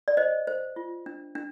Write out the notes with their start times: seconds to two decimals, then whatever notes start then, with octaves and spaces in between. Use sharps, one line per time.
0.08 D5
0.17 C5 D#5
0.47 C5
0.76 F4
1.06 D4
1.35 D4